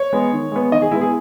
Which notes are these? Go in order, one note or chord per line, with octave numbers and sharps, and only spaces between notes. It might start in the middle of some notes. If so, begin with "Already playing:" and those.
Already playing: C#5
G#3 B3
D#3
G#3 B3
D#3 D#5
G#4
G#3 B3 E4
G#4